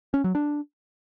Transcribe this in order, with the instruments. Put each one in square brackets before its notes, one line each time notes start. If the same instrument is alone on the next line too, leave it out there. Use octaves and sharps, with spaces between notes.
[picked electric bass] C#4
F#3
D4